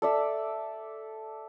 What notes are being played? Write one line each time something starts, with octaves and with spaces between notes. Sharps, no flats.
A4 D5 E5